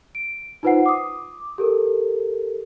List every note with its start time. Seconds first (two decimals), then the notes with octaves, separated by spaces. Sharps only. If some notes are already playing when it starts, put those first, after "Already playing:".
0.15 D7
0.63 D#4 F4 B4 C5 F#5 C7
0.86 D6 D#6
1.58 G4 A4 A#4